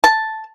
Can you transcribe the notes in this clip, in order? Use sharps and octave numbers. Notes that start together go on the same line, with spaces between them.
A5